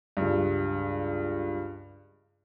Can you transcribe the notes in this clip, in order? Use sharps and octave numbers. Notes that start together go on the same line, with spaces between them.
C#2 G2